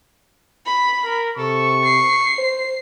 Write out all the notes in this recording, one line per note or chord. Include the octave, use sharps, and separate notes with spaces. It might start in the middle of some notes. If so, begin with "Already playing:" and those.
B5
A#4
C3 A4 C#6
C7
C5